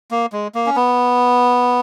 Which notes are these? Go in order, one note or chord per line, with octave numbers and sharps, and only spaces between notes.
A#3
G#3
A#3
C#4
B3